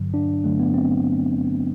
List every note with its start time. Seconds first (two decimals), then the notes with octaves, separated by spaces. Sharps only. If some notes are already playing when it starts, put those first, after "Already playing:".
Already playing: G2 D3 F#3
0.14 D4
0.44 G2 D3 F#3 A3
0.60 B3
0.74 C4